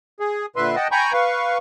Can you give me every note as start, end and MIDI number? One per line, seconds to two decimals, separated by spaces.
0.20 0.46 68
0.56 0.76 46
0.56 0.76 50
0.56 0.76 71
0.56 0.76 76
0.56 0.76 84
0.76 0.88 75
0.76 0.88 78
0.76 0.88 79
0.76 0.88 81
0.91 1.13 79
0.91 1.13 80
0.91 1.13 82
0.91 1.13 83
0.91 1.13 85
0.91 1.13 91
1.13 1.58 71
1.13 1.58 77
1.13 1.58 85